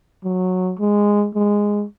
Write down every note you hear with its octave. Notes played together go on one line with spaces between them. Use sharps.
F#3
G#3
G#3